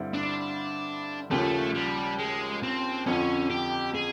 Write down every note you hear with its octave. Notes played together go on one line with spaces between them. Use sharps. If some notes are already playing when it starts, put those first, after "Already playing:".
Already playing: G2 D3 G3 C4 E4
D4
D#2 C#3 F3 A3
G3
G#3
C4
F2 D3 F3 C#4
G4
G#4